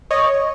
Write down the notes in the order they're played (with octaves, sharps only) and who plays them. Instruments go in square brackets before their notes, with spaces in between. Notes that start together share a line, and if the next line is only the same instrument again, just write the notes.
[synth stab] C#5 D#5